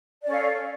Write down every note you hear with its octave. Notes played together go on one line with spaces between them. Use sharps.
C#4 A4 D5 F5